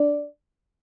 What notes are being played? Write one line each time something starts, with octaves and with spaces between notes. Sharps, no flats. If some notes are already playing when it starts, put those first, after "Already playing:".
Already playing: D4 D5